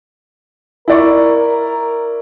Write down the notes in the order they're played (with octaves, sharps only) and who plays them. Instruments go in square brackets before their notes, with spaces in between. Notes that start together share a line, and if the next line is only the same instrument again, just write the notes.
[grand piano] E4 D5 C#6 [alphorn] A#4